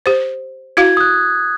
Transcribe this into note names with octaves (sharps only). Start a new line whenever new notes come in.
G4 C5
E4 F#4 F5 G#6
D#6 F#6